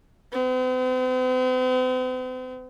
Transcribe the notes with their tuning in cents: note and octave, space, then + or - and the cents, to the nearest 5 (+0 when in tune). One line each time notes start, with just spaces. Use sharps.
C4 -45